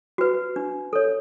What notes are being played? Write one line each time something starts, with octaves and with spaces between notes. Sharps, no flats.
F#4 B4
D4
A4 C#5